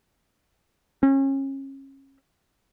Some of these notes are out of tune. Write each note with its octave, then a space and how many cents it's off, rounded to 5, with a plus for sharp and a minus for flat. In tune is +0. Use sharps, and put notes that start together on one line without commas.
C#4 -30